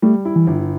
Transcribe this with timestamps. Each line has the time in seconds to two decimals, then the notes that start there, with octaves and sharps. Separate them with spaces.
0.02 G3 A3
0.25 E4
0.36 E3
0.47 G1